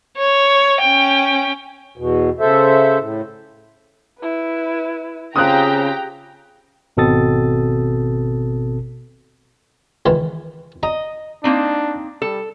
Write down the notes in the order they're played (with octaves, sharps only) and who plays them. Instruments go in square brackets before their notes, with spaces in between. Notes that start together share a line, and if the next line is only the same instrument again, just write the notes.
[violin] C#5
C#4 G5
[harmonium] E2 B2
C#3 A4 C5 E5
A2
[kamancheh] E4 B4
[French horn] C#3 [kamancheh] C4 F4 [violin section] G4 G5 A#5 [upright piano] D#6 F#6
[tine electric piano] G#1 B2 C4 A4 D#6 A6
[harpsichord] C#2 D#3 E3
[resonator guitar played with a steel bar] D#5 [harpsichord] A#5
[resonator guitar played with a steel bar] A#3 C4 D#4 [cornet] D4
[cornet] G3 [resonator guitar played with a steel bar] A4